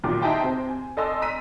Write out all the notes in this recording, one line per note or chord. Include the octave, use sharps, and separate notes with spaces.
B1 A#2 D#3 G4 D6
D#4 G#4 E5 G5 A5 C6
C3 C5
G#5
A4 D5 D#5 G#5 C6 E6
A#5 E6 B6 D#7